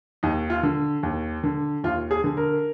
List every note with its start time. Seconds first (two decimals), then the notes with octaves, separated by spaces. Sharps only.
0.23 D#2 D#4
0.50 F4
0.63 D3
1.03 D#2
1.43 D3
1.84 D#2 F4
2.11 G#4
2.24 D3
2.37 A#4